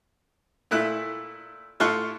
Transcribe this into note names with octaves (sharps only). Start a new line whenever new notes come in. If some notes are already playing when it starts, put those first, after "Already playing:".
A#2 A3 E4 F#6
A2 F4 A4 C6 C#6 F#6